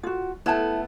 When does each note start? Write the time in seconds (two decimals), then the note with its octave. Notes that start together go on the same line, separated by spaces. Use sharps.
0.03 F4 F#4
0.46 A3 B3 E4 A5